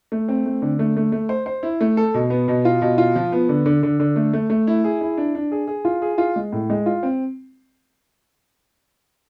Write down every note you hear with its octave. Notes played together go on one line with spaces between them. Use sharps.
A3
C4
A3
D3
A3
A3
A3
C5
C5
E4
A3
A4
B2
B3
B2
F4
B2
F4
F3
B3
D3
D3
D3
D3
A3
A3
A3
E4
G#4
E4
D4
D4
G#4
G#4
F4
G#4
F4
G#3
A2
G#3
F4
C4